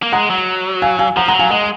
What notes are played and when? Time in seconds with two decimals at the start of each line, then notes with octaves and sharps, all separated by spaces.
0.03 A#3
0.12 G#3 F#5 A#5
0.30 F#3
0.82 F5 G#5
0.99 F5 G#5
1.17 F3 F#5 A#5
1.28 G#3 F#5 A#5
1.34 F#3
1.39 F5 G#5
1.51 G#3 D#5 F#5